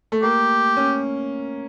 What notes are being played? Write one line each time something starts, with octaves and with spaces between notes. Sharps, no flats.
A3
A#3 G4
C#4